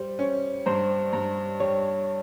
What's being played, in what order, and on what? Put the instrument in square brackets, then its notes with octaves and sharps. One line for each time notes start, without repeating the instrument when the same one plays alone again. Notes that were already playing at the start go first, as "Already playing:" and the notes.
Already playing: [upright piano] G3 [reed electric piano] C5
[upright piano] C#4
[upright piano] G2 [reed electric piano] C5
[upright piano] G2
[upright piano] G3 [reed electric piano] C#5